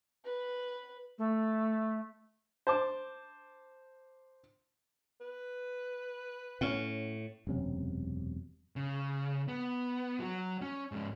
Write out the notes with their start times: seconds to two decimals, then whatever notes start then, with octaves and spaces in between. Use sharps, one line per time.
0.25 B4
1.18 A3
2.67 C5 A5 D6
5.21 B4
6.61 A2 C#4 F#5
7.47 E1 F#2 C3 C#4
8.76 C#3
9.48 B3
10.20 F#3 F#4
10.62 C#4
10.92 G#2 C#4